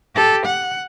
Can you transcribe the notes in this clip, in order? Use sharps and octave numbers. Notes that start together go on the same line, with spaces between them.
G4 A4
F#5